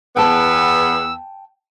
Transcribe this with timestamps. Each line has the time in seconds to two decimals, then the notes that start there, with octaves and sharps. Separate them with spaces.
0.17 E2 B3 G5 A5 E6